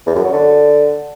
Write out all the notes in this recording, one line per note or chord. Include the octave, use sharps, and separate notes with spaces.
E2
F#2
F#3
D3